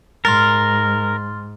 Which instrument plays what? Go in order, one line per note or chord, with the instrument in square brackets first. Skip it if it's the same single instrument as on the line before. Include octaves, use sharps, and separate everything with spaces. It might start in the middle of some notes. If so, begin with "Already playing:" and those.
[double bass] G#2 [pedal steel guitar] A#4 [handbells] C6 F6 A6